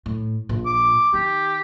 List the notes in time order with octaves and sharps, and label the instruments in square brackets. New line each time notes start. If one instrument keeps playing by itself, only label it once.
[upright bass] A2
A#1 F3
[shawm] D6
[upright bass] D#3 [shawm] G4